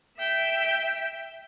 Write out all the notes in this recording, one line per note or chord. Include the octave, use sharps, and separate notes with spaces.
E5 G5